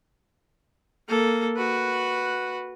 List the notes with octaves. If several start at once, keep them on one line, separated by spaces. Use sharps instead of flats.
A#3 A4
F#4 B4